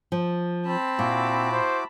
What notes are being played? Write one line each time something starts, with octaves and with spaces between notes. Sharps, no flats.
F3
C4 A5 B5
A#2 E4 F#4 D6
C5